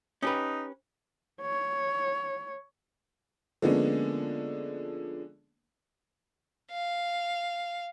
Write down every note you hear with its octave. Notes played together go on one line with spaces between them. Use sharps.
C#4 D#4 G4 B4
C#5
D3 F3 G#3 A#3 B3 C#4
F5